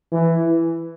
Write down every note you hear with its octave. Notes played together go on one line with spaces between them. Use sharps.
E3